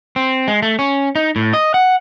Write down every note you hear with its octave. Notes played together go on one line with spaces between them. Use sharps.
C4
G#3
A3
C#4
D#4
A2
D#5
F#5